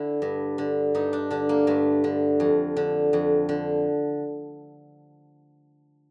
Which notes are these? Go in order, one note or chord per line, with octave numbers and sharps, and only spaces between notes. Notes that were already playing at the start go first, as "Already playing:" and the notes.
Already playing: D3 E4
G2
D3
G2 D#4
D4
D3 D4
A#3
G2 A3
D3
F2
D3
F2
D3